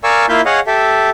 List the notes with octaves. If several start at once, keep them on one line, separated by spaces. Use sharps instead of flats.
A#4 D5 F5 G#5 C#6 E6
A#3 E4 F4 E5 F5 G6
G#4 C#5 D#5 F5 F#5
G4 A4 E5